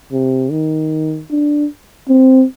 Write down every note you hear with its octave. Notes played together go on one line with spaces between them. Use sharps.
C3
D#3
D4
C4